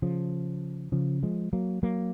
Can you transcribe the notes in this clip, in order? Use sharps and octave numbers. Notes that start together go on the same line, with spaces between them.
C#3 F3
C#3 F3
F3 G#3
F#3 A#3
F#3 A#3